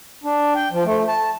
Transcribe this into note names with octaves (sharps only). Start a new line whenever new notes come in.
D4
G5
F3
A3
A5